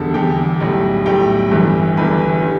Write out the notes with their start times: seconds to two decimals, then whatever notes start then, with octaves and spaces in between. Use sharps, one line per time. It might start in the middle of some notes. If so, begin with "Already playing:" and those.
Already playing: E1 E2 D3 G3 A4 A5
0.14 E1 E2 D3 G3 G4 G5
0.60 B1 A2 G3
1.06 B1 A2 G3 G4 G5
1.51 G1 G2 E3
1.97 G1 G2 E3 B4 B5
2.42 D3 G3